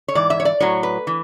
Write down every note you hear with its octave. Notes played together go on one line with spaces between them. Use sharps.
C#5
G#2 E3 D5
E5
C#5
D5
A2 F#3 C#5
B4
E3